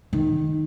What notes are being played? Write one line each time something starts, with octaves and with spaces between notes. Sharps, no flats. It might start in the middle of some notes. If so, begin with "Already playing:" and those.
D#3